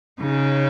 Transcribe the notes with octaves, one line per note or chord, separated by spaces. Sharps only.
C#3 D#4